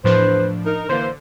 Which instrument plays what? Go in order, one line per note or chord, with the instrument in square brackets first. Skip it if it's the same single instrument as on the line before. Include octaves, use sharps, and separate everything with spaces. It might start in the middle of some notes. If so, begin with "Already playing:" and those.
[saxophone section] E2 B4 C5 [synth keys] A2 F3 D4
[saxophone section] D#4 A#4
[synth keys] D3 [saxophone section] E3 A#3 C5